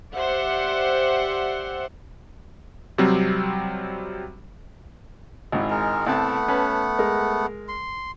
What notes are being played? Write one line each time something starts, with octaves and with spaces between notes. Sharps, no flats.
G4 C5 D5 E5 F#5
C3 F#3 G3 C4
G#1 G#2 E4
G#3 A#4
C2 A3 B3 C4 F#5 A5
C#4 B4 A5
G#3 A#4
C6